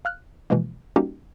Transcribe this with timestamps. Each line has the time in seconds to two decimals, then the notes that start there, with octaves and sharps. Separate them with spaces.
0.05 F5 F6 F#6
0.50 B2 E3 F3 G#3 A#3
0.96 G3 A#3 C#4 D#4 F#4 G4